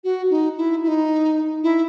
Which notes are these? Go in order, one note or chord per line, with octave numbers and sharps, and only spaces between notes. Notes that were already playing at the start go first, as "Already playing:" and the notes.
F#4
D#4
E4
E4
D#4
E4